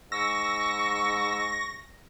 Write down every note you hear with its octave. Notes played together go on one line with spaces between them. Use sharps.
G#2 C#6 E6 A#6